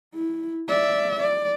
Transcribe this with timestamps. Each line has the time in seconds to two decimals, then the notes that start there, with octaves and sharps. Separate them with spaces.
0.14 E4
0.68 D5 E5
1.20 D5